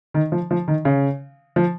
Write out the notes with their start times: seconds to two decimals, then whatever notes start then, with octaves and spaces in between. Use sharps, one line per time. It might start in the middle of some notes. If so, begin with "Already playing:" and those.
0.14 D#3
0.32 F3
0.51 F3
0.68 D#3
0.85 C#3
1.56 F3